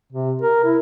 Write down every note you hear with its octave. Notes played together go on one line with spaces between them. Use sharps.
C3
A#4
E4